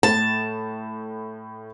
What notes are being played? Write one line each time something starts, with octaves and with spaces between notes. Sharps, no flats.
A2 A5